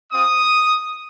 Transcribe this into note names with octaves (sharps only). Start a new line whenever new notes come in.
C4 F4 D#6